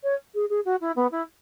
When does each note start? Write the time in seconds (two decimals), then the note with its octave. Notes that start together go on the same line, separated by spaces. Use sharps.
0.03 C#5
0.35 G#4
0.50 G#4
0.65 F#4
0.81 E4
0.96 B3
1.12 E4